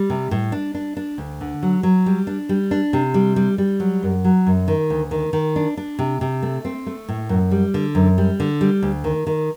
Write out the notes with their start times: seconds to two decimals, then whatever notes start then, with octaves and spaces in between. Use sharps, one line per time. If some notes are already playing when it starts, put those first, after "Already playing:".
Already playing: G3
0.10 C3
0.31 A2
0.52 D4
0.75 D4
0.97 D4
1.18 D2
1.41 D3
1.63 F#3
1.83 F#3
2.06 G3
2.27 D4
2.49 G3
2.71 D4
2.93 C3
3.14 G3
3.36 G3
3.58 G3
3.80 F#3
4.03 F#2
4.24 F#3
4.47 F#2
4.68 D#3
4.90 D2
5.11 D#3
5.33 D#3
5.56 D4
5.77 D4
5.99 C3
6.21 C3
6.43 A3
6.65 C4
6.86 A3
7.08 A2
7.29 F#2
7.51 G3
7.74 D3
7.95 F#2
8.18 G3
8.40 D3
8.61 G3
8.82 D2
9.04 D#3
9.27 D#3